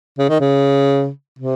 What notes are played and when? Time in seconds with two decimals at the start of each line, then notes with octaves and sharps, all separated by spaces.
0.19 C#3
0.29 D#3
0.41 C#3
1.39 C3